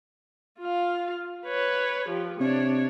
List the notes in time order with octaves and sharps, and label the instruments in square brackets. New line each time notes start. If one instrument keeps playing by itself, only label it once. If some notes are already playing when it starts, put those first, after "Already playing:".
[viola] F4 F5
B4 C#5
F3 G4
[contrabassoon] C3 [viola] D4 C#5